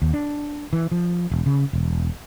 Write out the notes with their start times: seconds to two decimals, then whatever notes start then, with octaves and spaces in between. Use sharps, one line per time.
0.02 D#2
0.13 D4
0.73 E3
0.92 F3
1.31 E1
1.46 C#3
1.73 E1